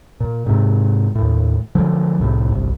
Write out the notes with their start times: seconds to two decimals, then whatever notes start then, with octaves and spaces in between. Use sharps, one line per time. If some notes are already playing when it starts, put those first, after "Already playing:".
0.20 A#2
0.46 G#2 C3
1.15 D#2 A2
1.75 D3 F3 F#3
2.19 C2 A2 C3
2.50 G1 C2